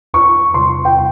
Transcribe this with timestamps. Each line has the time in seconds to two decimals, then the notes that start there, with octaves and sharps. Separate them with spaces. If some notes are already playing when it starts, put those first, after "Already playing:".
0.14 E2 C#6
0.54 C3 G3 C6
0.85 G5
0.96 C3